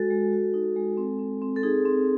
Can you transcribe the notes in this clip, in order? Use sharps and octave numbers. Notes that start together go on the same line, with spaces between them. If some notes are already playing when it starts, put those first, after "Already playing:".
Already playing: G#3 F#4 A4
G#3
F#4
D#4
G#3
C4
C4
C4
A4
D#4 G#4
C4